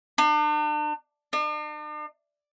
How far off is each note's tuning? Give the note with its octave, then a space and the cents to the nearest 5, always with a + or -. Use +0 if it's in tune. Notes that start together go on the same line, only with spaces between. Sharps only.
D4 +40
D4 +45